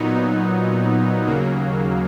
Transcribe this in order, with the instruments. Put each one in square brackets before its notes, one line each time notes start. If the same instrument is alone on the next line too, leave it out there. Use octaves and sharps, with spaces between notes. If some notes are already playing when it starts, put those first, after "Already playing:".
Already playing: [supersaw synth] A#2 F#3 B3 D#4
D#2 C#3 F#3 A#3